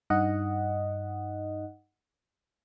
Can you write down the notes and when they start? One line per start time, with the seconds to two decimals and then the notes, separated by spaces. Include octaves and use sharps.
0.10 G2 D#4 D#5 F#5